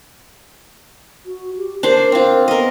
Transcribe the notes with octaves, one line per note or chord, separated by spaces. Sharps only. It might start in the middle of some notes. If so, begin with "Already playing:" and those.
F#4
G4
D4 A#4 C5
C4 F4
B3 A#4 D#5